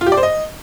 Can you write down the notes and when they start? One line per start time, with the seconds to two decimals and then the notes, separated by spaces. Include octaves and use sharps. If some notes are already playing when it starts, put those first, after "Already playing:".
0.01 F4
0.06 G4
0.12 D5
0.17 C5
0.23 D#5